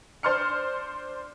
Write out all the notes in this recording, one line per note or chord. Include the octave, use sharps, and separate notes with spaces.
D4 C5 D5 C6 F6 C#7